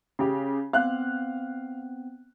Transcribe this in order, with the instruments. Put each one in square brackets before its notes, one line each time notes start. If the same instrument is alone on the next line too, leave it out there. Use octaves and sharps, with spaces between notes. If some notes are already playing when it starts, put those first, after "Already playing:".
[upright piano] C#3 G4
[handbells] B3 C4 [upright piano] F5 F#6